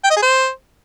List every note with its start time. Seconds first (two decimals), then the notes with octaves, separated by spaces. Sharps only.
0.04 G5
0.10 D#5
0.16 G#4
0.22 C5